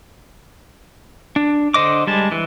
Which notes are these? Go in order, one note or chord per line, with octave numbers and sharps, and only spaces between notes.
D4
D3 C5 D#5 D6
G3 G#3 A5
E3